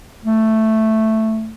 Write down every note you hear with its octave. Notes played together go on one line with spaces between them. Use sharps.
A3